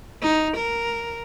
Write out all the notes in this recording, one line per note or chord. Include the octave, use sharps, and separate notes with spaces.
D#4
A#4